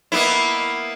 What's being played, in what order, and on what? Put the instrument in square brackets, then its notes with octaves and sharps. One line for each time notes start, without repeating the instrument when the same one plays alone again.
[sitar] A#3 B3 E4